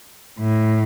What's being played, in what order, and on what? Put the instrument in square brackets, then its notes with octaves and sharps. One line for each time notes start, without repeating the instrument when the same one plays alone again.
[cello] A2